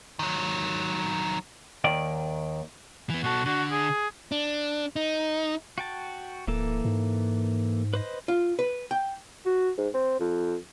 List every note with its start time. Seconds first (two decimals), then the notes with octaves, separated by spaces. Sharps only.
0.19 D#3 F#3
1.84 D#2 D#3 D5
3.10 E3 B3
3.24 B2 F#4 A4
3.46 D3 F#4
3.71 G#4
4.32 D4
4.96 D#4
5.78 F#4 G5 A5
6.47 D1 E3 A#3 A4
6.85 G#2
7.94 B4 C5 D#5
8.28 F4
8.59 B4
8.91 G5
9.45 F#4
9.78 G#2
9.94 C4
10.20 F2